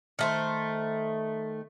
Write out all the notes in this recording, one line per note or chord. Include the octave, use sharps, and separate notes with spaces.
D#3 A3 C5